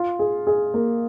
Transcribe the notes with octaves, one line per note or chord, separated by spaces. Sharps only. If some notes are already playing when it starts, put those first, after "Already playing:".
Already playing: F4
G#4
G#4
A#3